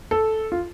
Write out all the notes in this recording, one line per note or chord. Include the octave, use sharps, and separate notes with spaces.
A4
F4